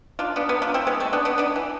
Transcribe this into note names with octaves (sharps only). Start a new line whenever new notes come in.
D4 F4
B3 D4
B3 D4
D4 F4
C4 E4
G#3 B3
A3 C4
B3 D4
B3 D4
B3 D4
E3